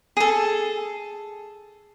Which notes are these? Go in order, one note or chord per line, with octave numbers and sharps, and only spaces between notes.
G#4 A4